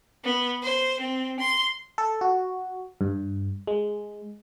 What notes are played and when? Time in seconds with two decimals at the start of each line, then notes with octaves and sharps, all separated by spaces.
0.25 B3
0.63 C5
1.01 C4
1.40 C6
1.98 A4
2.21 F#4
3.01 G2
3.67 G#3